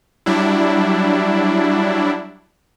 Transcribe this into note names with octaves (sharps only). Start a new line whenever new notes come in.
F#3 G3 D4 E4